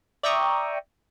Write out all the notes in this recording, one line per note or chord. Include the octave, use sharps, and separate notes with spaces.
D5 E5 G5 A#5 C#6 D#6